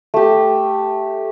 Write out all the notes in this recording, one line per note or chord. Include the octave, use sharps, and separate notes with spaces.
A3 G4